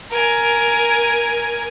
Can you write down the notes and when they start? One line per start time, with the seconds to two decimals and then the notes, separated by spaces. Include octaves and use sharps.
0.10 A#4 G#5